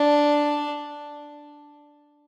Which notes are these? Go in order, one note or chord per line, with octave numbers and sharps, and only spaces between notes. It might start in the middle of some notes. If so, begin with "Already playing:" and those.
Already playing: D4